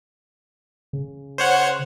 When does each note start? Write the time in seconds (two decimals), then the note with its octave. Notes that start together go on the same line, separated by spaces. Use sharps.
0.93 C#3
1.38 C5 C#5 F#5